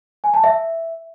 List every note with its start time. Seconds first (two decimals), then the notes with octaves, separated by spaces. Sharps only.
0.24 G#5
0.34 A5
0.44 E5